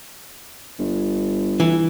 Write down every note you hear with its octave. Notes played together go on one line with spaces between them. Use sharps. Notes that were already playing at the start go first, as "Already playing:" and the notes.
G1
E3